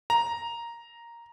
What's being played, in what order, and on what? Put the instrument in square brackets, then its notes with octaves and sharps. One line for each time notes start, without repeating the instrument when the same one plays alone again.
[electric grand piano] A#5